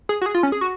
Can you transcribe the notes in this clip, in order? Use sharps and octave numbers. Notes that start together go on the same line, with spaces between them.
G#4
F#4
G#4
F4
C#4
G#4
F#4